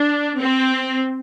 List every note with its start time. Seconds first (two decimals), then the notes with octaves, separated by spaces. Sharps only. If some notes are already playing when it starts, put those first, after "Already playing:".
Already playing: D4
0.39 C4